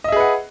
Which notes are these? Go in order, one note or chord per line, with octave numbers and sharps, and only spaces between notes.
G#4 B4 D#5 E5 F#5